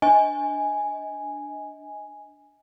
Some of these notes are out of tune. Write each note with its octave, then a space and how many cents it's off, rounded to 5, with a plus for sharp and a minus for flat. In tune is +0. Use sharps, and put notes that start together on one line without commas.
D4 +0 D#5 +30 G#5 +0